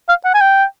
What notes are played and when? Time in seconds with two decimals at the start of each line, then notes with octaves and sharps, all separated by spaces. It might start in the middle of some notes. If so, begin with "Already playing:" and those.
0.09 F5
0.24 F#5
0.34 G#5
0.41 G5